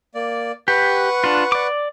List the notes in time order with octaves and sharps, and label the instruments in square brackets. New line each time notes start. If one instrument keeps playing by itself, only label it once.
[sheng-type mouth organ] A#3 D5
[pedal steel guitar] G4 [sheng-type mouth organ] B4 F#5 C#6
[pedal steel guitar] D4 F4
D5 D6